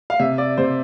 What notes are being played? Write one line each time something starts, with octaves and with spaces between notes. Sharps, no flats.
F5
C3 E5
D5
C3 C5